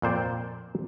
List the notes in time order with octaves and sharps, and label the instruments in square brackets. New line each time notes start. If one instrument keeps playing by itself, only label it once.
[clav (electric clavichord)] F2 A#2 C5 D5 G5